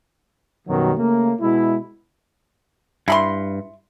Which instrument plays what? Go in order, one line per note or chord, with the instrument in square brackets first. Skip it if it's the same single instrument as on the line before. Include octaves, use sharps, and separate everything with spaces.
[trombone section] F#2 B2 D#3 F#3 G3
C#3 A3 A#3
B2 G#3 E4
[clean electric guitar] G2 [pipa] E4 B5 C6